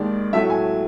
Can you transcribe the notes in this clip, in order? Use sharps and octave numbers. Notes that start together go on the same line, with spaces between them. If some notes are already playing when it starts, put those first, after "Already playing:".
Already playing: D#2 D#3 G#3 D5
A2 F#3 A3 E5
G#5